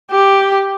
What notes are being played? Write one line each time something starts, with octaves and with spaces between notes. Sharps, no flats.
G4